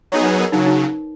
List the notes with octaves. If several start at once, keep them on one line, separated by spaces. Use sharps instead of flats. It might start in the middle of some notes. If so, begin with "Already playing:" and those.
F#3 B3 D#4 G#4 C#5
B4
A#4
C#3 F#3 D#4
D#4